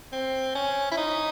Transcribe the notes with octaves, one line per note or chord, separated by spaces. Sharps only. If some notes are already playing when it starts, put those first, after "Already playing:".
C4
C#4
E4
D#4